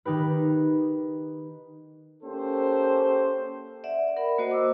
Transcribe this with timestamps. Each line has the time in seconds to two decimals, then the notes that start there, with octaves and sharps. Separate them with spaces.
0.05 D#3 D#4 G4 B4
2.24 A#3 C#4 G4 A4 C5
3.84 D5 E5 F#5
4.17 A#4 F#5 B5
4.38 A#3 F#4 C5 D#5
4.51 D6 E6